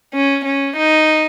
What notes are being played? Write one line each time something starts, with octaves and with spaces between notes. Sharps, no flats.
C#4
C#4
D#4